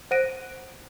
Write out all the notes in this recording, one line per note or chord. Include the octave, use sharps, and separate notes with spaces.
C5 F#5 F#6 A#6 D7 D#7